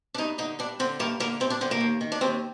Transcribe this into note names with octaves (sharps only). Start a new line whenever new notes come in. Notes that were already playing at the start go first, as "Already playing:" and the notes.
D4
G2 D#4
D3 D#4
G2 D4
D3 C4
G2 A#3
D3 A#3
G2 C4
D4
D3 C4
A#3
D#2
D#3
D4
D#2 C4